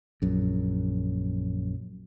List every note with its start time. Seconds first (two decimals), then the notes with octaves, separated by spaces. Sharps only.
0.22 A#1 F#2